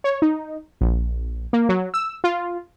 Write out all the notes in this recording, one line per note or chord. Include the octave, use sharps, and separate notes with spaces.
C#5
D#4
A#1
A#3
F#3
E6
F4